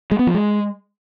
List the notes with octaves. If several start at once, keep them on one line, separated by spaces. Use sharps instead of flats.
G#3
B3
F3
G#3